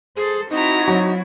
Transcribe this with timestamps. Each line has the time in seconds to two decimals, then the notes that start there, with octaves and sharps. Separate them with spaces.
0.17 G#4 A4 C5
0.51 C4 D#4 E4 F#4 A#5
0.88 F#3